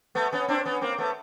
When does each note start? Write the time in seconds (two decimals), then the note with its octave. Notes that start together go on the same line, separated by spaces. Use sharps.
0.15 A3 B3
0.32 B3 C#4
0.48 C4 D4
0.65 B3 C#4
0.81 A#3 C4
0.98 A3 B3